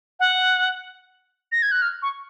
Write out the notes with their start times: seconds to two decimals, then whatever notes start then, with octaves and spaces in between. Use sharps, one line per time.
0.20 F#5
1.52 A#6
1.62 G#6
1.72 F#6
1.82 F6
2.02 C#6